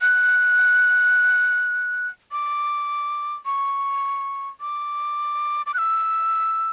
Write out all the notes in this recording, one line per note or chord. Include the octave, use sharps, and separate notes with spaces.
F#6
D6
C#6
D6
D6
F#6
E6